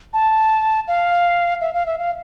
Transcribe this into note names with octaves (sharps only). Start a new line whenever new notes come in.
A5
F5
E5
F5
E5
F5